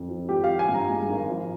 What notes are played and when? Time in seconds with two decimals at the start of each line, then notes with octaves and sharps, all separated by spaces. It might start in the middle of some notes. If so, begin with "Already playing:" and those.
Already playing: F2
0.09 F3
0.29 G#1 G4
0.44 F3 F5
0.59 G#5
0.69 G2
0.74 A#5
0.89 G#3
1.09 G#1
1.29 F3